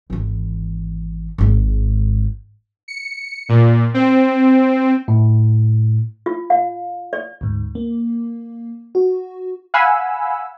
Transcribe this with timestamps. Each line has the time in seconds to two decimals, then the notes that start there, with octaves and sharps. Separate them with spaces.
0.10 G#1 E3
1.38 G#1 G#2
2.88 C#7
3.49 A#2
3.94 C4
5.08 A2
6.26 F4
6.50 F5
7.13 D5
7.41 D2 G#2
7.75 A#3
8.95 F#4
9.74 F5 F#5 G#5 B5 E6